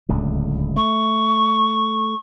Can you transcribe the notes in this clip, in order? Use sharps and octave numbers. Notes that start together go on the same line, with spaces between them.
D1 C#2 D3
A3 C#6